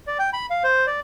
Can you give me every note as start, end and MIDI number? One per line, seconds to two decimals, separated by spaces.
0.07 0.18 74
0.19 0.30 79
0.33 0.46 83
0.50 0.63 77
0.64 0.86 72
0.87 1.00 74